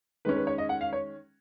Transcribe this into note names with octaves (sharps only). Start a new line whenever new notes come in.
D#3 G#3 C#4 B4
B4
C#5
D#5
F#5
F5
C#5